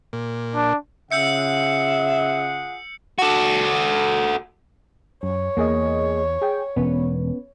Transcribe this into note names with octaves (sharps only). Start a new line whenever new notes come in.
A#2
D4
C#3 F4 G#4 E5 F#5 E6 G6 C#7
F#4 A4
F#2 C#5
E2 A#3 G#4 D#5
G#4 G5
E1 B3 C#4 B4